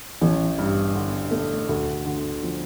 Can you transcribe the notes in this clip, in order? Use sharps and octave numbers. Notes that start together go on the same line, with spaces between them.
A1
G2
D3
A3
D2
D3
F3